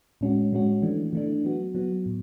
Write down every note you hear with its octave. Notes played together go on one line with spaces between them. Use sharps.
A2 G#3 C#4 F#4
A2 G#3 C#4 F#4
E3 A3 D4
E3 A3 D4
F#3 B3 F#4
F#3 B3 F#4
A2